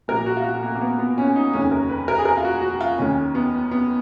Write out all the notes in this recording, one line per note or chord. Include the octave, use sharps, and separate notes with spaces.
A#1 A#2 A#4
F#4
F4
F#4
A#3
A#3
B3
B3
C#4
D#4
F1 D#2 C#3 C#4
A#4
B4
A#4
G#4
A#4
F4
F#4
F#4
F4
D#2 D#3 C#4
B3
B3